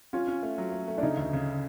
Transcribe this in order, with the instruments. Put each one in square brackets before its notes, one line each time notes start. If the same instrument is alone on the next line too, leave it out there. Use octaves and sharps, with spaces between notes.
[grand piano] C#4 [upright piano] F4
[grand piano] C#4
A3
F#3
A3
A3
[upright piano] D4
[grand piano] C#3 [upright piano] D#4
[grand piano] D2
C#3